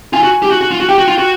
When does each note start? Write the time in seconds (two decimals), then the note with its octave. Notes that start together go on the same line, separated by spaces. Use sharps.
0.13 F4 G#5
0.23 F#4
0.42 G4
0.51 F#4
0.61 F#4
0.71 F4
0.80 F#4
0.89 G4 G5
0.98 F#4
1.08 F4
1.18 F#4